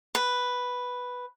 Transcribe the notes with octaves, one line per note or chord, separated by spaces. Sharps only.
B4